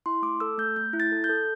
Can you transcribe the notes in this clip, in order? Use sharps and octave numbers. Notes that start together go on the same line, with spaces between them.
E4 C6
A3 D6
A4 E6
A3 G6
A3 G6
E4
A6
A4
G6
A4